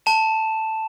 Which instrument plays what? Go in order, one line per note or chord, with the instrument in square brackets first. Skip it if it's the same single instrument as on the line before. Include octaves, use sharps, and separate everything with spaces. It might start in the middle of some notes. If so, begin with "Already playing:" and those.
[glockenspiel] A5 E7